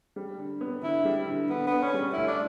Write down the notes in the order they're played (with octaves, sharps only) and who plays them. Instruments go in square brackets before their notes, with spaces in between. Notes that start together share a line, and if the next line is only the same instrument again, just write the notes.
[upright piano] G3
D3
B3
[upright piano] D3 [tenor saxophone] E4
[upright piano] G3
D3
[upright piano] D3 [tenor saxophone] B3
[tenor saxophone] B3 [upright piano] D4
[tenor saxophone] C#4
[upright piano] G3
[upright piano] D2 [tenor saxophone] E4
[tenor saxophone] D4